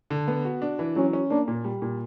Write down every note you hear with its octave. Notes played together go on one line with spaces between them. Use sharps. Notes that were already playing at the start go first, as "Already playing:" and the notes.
D3
B3
F#4
D4
E3
F#3 C#4
C#4
A#3 D4
A#2
G3
A#2